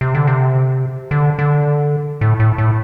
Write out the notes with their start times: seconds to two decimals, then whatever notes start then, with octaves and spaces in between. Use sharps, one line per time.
0.01 C3
0.15 D3
0.27 C3
1.11 D3
1.39 D3
2.21 A2
2.40 A2
2.58 A2